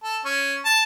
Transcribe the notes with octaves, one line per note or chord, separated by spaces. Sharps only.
A4
C#4
A5